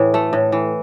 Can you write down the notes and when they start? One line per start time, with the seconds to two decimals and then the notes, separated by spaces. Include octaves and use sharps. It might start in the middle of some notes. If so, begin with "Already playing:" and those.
Already playing: A2 E3
0.14 A3
0.33 A2
0.52 E3